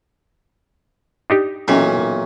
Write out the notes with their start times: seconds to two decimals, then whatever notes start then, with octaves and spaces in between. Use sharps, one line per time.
1.30 D4 D#4 G4
1.68 B1 A#2 D#3 E3 C#4